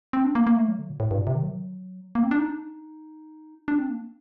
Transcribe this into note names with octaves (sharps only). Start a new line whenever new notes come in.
C4
D4
A#3
A#3
A3
F#3
D3
A#2
A2
G2
A#2
C3
D#3
F#3
A#3
C4
D4
D#4
D4
C4
A#3